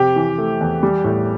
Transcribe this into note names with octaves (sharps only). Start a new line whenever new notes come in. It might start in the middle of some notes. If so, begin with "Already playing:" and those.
Already playing: F2 C3 G4
E3
A3
E2
G3
A2